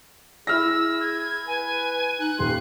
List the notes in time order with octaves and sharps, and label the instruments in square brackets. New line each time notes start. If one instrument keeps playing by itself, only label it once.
[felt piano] E4 F6 A#6 [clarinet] G#4 [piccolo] E6
[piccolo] G#6
[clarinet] B4 [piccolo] G#5
[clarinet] D#4 [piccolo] F#6
[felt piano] D#1 [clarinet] C6